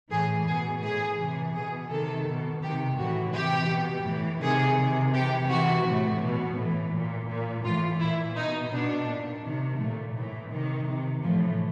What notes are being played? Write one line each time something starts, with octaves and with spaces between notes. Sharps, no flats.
A2 E3 G#4
B2 G#4
A2 E3 G#4
C3 E3
B2 G#4
C3 D#3 A4
B2
C3 D#3 G4
A2 E3 F#4
C3 E3 G4
B2
A2 E3
C3 D#3 G#4
C3 D#3
C3 E3 G4
C3 E3 F#4
A2 E3
B2
A2 E3
A#2
A#2
A2 E3 F4
A#2 E4
B2 D#4
B2 D4
A#2
C3 D#3
A#2 A3
A2 E3
C3 D#3
C3 D#3
A2 E3 F3